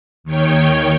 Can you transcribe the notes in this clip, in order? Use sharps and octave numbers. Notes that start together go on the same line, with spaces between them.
D#2 D#3 C#5 G5